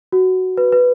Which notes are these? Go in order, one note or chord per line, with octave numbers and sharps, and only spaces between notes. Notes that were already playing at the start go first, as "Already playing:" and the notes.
F#4
B4
B4